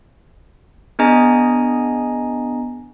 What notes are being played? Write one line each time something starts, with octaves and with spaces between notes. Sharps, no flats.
B3 D4 G#4 D#5 G#5 A#5